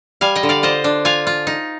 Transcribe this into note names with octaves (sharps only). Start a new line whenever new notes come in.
G3 F5 G#5
D#5 G5
D3
D5 F5
F4 C5 D#5
D4
F4 F5 G#5
F4
D#4